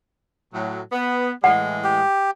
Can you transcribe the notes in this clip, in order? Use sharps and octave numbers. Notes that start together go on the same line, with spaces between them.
A2 F#3
B3
A2 E3 G#3 F#5
G4